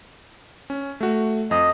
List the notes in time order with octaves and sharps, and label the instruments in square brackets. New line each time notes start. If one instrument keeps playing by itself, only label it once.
[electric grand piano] C#4
A3 F#4
[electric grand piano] F2 [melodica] D#5